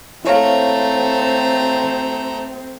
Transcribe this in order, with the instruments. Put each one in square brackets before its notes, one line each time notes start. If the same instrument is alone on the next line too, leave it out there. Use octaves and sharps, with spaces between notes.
[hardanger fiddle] A3 A#5 [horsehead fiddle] C4 C5 [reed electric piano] E4 C#5 F5